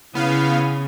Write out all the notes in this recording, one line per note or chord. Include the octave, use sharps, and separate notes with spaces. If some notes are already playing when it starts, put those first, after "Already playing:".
C#3 B3 E4 F5